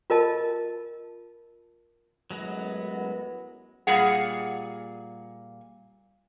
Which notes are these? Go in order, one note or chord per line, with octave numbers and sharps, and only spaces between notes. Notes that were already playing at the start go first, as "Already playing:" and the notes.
F4 A#4 D#5 A5
A1 F#2 F#3 G#3 B3 F#4
A#2 G3 G#4 F#5